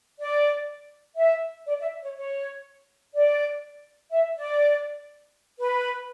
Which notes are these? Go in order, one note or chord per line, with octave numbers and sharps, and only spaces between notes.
D5
E5
D5
E5
C#5
C#5
D5
E5
D5
B4